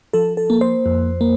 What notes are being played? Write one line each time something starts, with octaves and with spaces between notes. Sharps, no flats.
F3 A4
A4
A#3
C5
F2
A#3